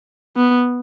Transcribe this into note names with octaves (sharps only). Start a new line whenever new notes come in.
B3